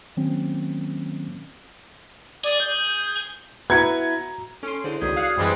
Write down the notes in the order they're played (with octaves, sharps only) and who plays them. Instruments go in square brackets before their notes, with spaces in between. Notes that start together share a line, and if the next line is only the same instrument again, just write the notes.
[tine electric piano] D#3 F#3 A#3 C4 C#4
[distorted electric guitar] G#4 [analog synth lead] D5
[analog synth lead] G6
[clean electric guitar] B3 E4 B4 [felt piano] F#4 A#5 C#7 [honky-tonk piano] G#6
[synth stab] C#4 C6 [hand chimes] A4
[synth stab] D3 C5 [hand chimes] E4 G#4 C#5
[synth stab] C#2 D#3 [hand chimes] F#4 D5 G6 [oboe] G#4
[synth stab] F5 F#6 C7 [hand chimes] E6 C#7
[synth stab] F#2 E3 B4 [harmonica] G3 G#3 C4